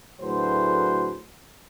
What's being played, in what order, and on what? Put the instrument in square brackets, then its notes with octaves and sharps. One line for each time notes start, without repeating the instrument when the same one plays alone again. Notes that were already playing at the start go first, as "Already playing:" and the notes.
[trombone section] D2 A2 F#3 G#4 B4 C5